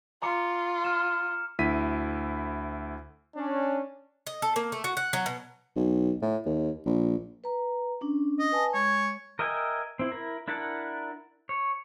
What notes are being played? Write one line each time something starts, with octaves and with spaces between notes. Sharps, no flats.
F4 A#5 D6 C#7
F6 E7
D2 E4 B6 D#7
C#4 D4
D#5
A4
A#3
A3
F#4
F#5
F#3
B2
B1
A2
D#2
A#1
B4 A#5
C#4 D4
D#5
B4 G#5 A5
G#3 C#5
A#4 D#5 E5 G5 G#5
C4 E4
E4 A#4
D4 E4 A#4 F#5 A5
C#5